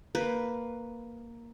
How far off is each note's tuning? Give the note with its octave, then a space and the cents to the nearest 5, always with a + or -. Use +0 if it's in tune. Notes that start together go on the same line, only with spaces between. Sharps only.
A#3 +0 B4 +0